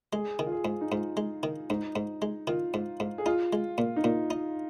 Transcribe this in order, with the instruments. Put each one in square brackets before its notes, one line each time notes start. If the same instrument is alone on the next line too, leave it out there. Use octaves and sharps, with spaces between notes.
[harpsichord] G#3 [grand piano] G#4
[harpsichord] D#3
[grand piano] F4
G#4
[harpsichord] G#2
[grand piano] D#4
[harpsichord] G#2 [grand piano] F4
[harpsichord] G#3
D#3
[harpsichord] G#2 [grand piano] D#4
[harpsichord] G#2
G#3
[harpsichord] D#3 [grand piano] F4
[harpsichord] G#2
G#2
[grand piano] G#4
[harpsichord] D#4 [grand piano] F4
[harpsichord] G#3
A#2
[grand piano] D#4
[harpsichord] A#2 [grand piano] F4
[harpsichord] D#4